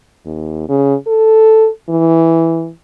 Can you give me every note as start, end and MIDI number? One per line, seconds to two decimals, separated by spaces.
0.25 0.67 39
0.68 0.95 49
1.07 1.68 69
1.89 2.69 52